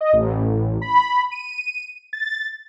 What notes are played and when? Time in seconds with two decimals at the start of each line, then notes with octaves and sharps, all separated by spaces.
0.01 D#5
0.13 A1
0.81 B5
1.32 D#7
2.13 A6